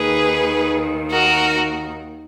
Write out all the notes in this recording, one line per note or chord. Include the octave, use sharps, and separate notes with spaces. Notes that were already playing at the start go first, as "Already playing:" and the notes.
Already playing: D#2 D#3 G#4 B4
F#4 A#4